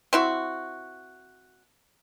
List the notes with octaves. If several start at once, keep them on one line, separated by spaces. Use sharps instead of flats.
C4 E4 F#4